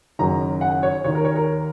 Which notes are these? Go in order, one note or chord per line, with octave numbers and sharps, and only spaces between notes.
F#1 F#2 D#3 A#5
F#5
C#5
D#2 D#3 C#5
A#4
C#5
A#4